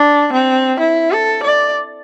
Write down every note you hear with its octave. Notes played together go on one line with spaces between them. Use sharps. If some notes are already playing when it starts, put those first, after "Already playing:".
Already playing: D4
C4
E4
A4
D5